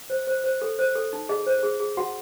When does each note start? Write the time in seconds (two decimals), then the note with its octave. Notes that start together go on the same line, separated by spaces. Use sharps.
0.10 C5
0.27 C5
0.44 C5
0.62 A4
0.79 C5
0.95 A4
1.13 D#4
1.29 G#4 D#5
1.47 C5
1.63 G#4
1.80 G#4
1.97 F#4 F#5